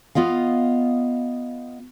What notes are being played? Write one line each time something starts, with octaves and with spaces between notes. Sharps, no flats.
B3 F4 D#5 F5